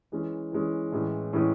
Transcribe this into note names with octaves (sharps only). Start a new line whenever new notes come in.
E3 G#3 C#4
E3 G#3 C#4
A2 E3 G#3 C#4
A2 E3 G#3 C#4